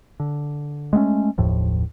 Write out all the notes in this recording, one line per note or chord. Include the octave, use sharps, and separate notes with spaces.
D3
G#3 A3 B3 C#4
F#1 D#2 A2 F3